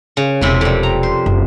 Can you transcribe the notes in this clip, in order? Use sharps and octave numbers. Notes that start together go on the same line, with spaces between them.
C#3
E1 E2 C3 E4
F2 G3
A#5
C5
F#1